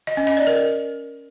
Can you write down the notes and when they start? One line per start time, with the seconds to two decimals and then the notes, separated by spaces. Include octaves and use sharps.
0.07 D#5
0.17 C#4
0.27 D#5
0.37 D5
0.47 A#4